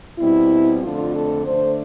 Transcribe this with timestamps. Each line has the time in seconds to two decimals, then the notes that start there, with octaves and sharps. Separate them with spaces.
0.18 B2 G3 C4 E4
0.81 F2 D3 A3 D4 F4
1.13 A4
1.45 D3 A3 D4 C5